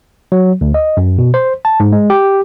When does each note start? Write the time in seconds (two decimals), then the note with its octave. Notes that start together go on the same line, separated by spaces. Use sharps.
0.32 F#3
0.61 D2
0.74 D#5
0.97 F#2
1.18 B2
1.34 C5
1.65 A5
1.80 G#2
1.92 G#3
2.10 G4